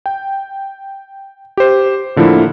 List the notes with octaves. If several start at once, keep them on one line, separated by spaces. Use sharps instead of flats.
G5
G4 C5
A2 D3 F3 A#3 E4